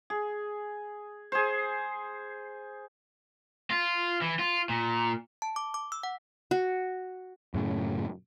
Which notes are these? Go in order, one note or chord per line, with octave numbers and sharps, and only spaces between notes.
G#4
G#4 C5
F4
E3
F4
A#2
A5
D6
D6
E6
F#5
F#4
F#2 A2 C#3